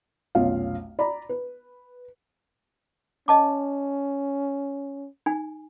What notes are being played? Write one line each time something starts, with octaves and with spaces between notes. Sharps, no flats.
F1 B1 C#4 F4 F5
D5 A#5 B5
B4
C#4 D#5 A5 D6
D#4 G#5